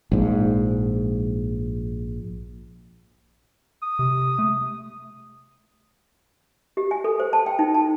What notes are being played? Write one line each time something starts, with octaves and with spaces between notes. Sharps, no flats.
A#1 G#2
D#6
C3
A3
G4
G#5
A4
C5
A5
G5
D#4
A5